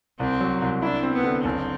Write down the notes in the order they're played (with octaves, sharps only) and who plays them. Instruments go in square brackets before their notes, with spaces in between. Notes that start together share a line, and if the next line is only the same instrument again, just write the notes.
[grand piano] C2 [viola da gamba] C4
[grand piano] F#3
C2
[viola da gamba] D4 [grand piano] E4
[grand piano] C4
[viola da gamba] B3
[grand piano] D3
[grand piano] F#1 [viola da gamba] C4